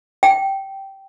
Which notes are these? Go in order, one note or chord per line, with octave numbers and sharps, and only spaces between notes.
G5